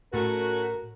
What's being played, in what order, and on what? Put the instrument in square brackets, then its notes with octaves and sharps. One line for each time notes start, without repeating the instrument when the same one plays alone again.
[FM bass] A2 [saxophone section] A3 C#4 F#4 [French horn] A#4